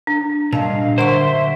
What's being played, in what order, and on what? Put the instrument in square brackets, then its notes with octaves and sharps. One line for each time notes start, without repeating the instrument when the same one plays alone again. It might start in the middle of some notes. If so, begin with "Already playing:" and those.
[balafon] D4
[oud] G2 D4 [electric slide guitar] A#2 [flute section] D#5 F5 [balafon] A5
[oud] F#2 D#3 [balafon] D3 F#5 C#6 [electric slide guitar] C5 [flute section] E5 C6